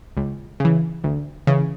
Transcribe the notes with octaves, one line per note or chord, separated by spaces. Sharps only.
C#2
C#3 E3
D2
C#3 E3